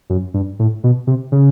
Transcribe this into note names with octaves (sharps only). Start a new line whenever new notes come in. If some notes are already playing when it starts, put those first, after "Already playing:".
F#2
G2
A2
B2
C3
C#3